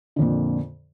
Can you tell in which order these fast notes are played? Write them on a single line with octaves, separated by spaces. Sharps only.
D3 F2 A#2